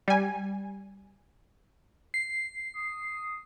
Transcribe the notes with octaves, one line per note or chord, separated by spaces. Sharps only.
G3 G#5
C7
D#6